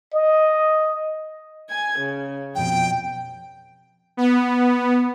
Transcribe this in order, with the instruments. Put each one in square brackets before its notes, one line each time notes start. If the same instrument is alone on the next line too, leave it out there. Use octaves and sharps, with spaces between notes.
[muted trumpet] D#5
[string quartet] G#5 G#6
C#3
[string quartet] F2 B2 [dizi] G5
[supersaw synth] B3